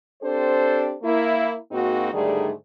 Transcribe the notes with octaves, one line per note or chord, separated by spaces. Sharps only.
C4 D4 G4 A4 C5
A#3 E4
G#2 A#3 C4 D#4 F#4
G#2 D3 D#3 G3 A3 G#4